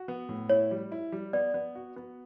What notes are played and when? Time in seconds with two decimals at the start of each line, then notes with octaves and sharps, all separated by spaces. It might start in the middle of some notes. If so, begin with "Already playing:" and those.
Already playing: F#4
0.08 B3
0.29 A2
0.49 E4 C#5
0.71 G3
0.92 E4
1.12 G3
1.33 B3 D5
1.54 B3
1.75 F#4
1.96 B3